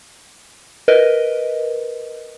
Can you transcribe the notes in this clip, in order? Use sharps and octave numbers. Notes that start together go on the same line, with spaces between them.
A#4 B4 D#5